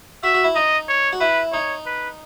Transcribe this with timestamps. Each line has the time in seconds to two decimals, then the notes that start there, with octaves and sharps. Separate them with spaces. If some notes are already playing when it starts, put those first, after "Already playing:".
0.23 F#4 E5
0.34 F#4
0.44 E4
0.55 D#4 D#5
0.88 C#5
1.13 F#4
1.20 E4 B4
1.52 D#4 C#5
1.86 B4